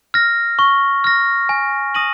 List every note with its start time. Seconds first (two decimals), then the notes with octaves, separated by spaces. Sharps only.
0.14 F6 A#6
0.59 C#6
1.04 F6 A#6
1.49 G#5
1.95 D#6 A#6 D#7 F#7